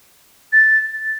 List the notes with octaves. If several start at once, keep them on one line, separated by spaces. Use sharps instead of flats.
A6